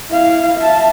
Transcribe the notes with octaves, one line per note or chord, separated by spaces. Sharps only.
E4 F5
E5 A5